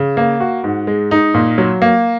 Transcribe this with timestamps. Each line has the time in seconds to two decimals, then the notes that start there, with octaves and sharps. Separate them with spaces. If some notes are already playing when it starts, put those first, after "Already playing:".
Already playing: C#3
0.17 A#3
0.40 F#4
0.64 G#2
0.87 G#3
1.11 D#4
1.34 A#2
1.58 F#3
1.82 A#3